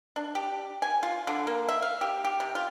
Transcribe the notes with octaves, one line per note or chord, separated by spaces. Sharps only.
D4
G4
G#5
F4
D3
A#3
E5
F5
G4
G4
C3
F4